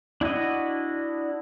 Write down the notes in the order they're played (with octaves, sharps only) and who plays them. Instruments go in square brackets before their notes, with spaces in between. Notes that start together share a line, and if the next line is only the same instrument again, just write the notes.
[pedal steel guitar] D4 E4 F#4 D#5